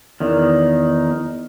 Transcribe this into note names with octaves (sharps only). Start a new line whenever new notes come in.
E2 D#3